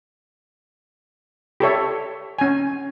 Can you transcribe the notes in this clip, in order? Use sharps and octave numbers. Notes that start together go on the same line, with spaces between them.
G4 A4 C#5 E5
C#4 G#5